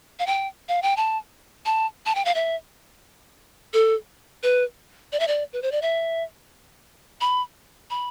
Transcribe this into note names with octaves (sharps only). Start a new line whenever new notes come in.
F5
G5
F5
G5
A5
A5
A5
G5
F5
E5
A4
B4
D5
E5
D5
B4
C5
D5
E5
B5
B5